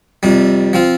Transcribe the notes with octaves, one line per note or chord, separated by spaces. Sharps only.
F2 C3 G3
F3 C4 F4